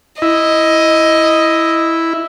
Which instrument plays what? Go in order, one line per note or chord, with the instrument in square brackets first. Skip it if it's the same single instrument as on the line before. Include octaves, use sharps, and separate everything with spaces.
[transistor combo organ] E4 [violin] D#5